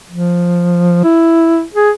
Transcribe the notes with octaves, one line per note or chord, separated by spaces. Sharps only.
F3
E4
G#4